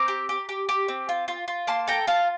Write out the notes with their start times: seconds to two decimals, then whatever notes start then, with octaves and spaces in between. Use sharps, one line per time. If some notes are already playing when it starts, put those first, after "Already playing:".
Already playing: C4 A#5 D6
0.08 G4
0.29 G4
0.49 G4
0.69 G4
0.88 C4
1.09 F4
1.28 F4
1.48 F4
1.67 A#3 A5 C6
1.88 A4 G5 A#5
2.07 F4 F5 A5